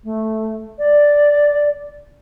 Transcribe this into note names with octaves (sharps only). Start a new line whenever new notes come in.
A3
D5